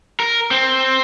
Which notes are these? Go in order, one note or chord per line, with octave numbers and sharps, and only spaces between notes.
A#4
C4